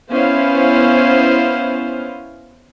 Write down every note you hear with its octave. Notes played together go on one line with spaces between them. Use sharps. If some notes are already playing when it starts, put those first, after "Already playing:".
B3 C#4 E4 C5 F5